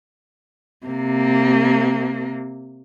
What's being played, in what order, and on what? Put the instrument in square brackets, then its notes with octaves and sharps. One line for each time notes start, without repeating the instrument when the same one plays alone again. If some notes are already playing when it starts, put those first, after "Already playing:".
[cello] C3 A#3